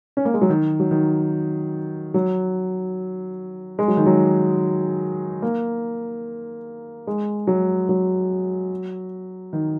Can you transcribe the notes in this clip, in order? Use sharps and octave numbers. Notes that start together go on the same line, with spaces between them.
C#4
A#3
G#3
F#3
D#3
F#3
D#3
F#3
G#3
F#3
D#3
F#3
A#3
G#3
F#3
F#3
D#3